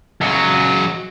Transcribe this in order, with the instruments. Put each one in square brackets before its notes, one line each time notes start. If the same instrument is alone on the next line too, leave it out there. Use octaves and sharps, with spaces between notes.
[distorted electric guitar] C#2 F#3